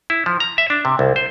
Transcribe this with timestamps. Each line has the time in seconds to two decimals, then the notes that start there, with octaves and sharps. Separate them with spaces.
0.10 E4
0.26 F3
0.40 A#5
0.58 E5
0.70 D4
0.85 C3
0.99 C2
1.16 C5